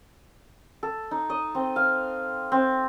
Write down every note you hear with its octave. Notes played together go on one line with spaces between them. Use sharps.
A4
D#4
D#5
C4
F5
C4